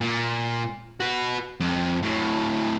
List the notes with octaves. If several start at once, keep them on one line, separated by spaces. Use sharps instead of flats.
A#2
F#4 B4
F2
A2 F#3